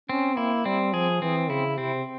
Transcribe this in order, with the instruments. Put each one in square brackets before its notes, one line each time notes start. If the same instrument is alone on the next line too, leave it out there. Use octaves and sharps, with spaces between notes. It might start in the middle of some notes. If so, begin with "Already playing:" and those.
[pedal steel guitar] C4 [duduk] C#4
[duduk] A#3 [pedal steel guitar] E4
[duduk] G3 [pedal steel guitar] C4
[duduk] F3 [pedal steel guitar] G#4
[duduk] E3 [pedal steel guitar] C4
[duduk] C#3 [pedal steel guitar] E4
[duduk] C3 [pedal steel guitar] C4